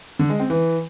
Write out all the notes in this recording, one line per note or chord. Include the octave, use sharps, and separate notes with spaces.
D3
G#3
C4
E3